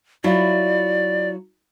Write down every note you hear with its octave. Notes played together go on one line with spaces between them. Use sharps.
F#3 E4 F4 D5